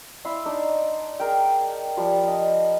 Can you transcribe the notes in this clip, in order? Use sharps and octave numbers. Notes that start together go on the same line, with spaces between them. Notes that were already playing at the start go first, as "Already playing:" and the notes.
E4 F5 C6 E6
D4 D#4 D5
G#4 A#4 G5
F3 G3
D#5